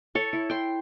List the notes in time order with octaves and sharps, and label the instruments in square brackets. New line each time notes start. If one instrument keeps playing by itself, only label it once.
[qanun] A4 C#5
E4
G5 C6